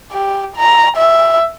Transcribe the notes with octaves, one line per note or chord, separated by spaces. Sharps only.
G4
A#5
E5